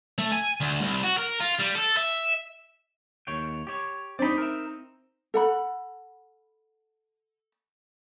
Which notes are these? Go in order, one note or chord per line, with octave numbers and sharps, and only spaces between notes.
A3
G#5
D2
C2
F#4
A#4
F4
G3
A4
E5
D#2 C#5 G5
G4 C#5
C4 D#4 D5 B5
A#4 E5
A4 F#5 B5